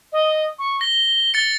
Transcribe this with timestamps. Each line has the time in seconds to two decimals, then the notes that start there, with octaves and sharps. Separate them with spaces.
0.12 D#5
0.59 C#6
0.81 A#6 G7
1.34 A6 C#7